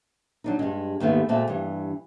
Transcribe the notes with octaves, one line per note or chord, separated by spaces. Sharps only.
F#3 D4 D#4
G2 G3 G#3
D#2 G#2 A3 B3
A#2 G#3 A3 C4 F#4 A5
G2 E3